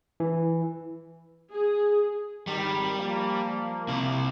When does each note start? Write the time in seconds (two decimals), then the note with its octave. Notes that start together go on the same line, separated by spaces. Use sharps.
0.20 E3
1.51 G#4
2.47 G#1 D#3 G3
2.97 F3 A#3
3.89 C3 E4